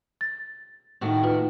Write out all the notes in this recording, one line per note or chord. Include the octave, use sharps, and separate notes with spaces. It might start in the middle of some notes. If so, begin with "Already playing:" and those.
A6
A2 D#3 F#4
D#4 F4 B4